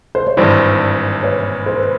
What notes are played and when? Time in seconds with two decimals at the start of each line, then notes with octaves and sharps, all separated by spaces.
0.15 C5
0.27 C#5
0.37 G#1 G2 E3 C5 D5
1.23 B4 C#5
1.66 C5
1.77 B4